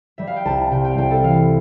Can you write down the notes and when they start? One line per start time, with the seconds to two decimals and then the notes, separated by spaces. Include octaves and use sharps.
0.18 G3 E5
0.27 F5
0.36 G5
0.45 C2 A5
0.61 A5
0.71 C3 G5
0.85 G5
0.91 F5
0.98 C2 G5
1.11 A4
1.24 E3 F5